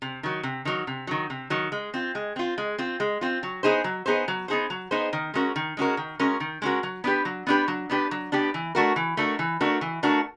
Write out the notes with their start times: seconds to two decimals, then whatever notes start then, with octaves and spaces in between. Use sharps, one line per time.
0.02 C3
0.23 D#3 F#3
0.43 C3
0.65 D#3 F#3
0.87 C3
1.07 D#3 F#3
1.30 C3
1.50 D#3 F#3
1.72 G#3
1.94 C4 F4
2.15 G#3
2.36 C4 F4
2.58 G#3
2.78 C4 F4
3.00 G#3
3.21 C4 F4
3.43 F#3
3.63 B3 D#4 G#4 C5
3.84 F#3
4.06 B3 D#4 G#4 C5
4.28 F#3
4.48 B3 D#4 G#4 C5
4.70 F#3
4.91 B3 D#4 G#4 C5
5.13 D#3
5.34 G#3 C#4 F#4 A#4
5.56 D#3
5.77 G#3 C#4 F#4 A#4
5.97 D#3
6.19 G#3 C#4 F#4 A#4
6.40 D#3
6.62 G#3 C#4 F#4 A#4
6.83 F#3
7.04 B3 D4 G4 B4
7.25 F#3
7.47 B3 D4 G4 B4
7.68 F#3
7.90 B3 D4 G4 B4
8.11 F#3
8.32 B3 D4 G4 B4
8.54 E3
8.75 A3 D4 F#4 A#4
8.96 E3
9.17 A3 D4 F#4 A#4
9.39 E3
9.61 A3 D4 F#4 A#4
9.81 E3
10.03 A3 D4 F#4 A#4